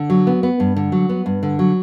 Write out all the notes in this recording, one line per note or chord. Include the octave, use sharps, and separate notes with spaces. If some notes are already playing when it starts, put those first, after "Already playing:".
Already playing: D3
F#3
B3
B3
G2
D3
F#3
B3
G2
D3
F#3